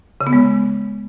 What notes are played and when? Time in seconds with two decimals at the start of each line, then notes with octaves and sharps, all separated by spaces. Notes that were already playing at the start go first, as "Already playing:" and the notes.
0.21 C#3
0.27 B3
0.33 G#3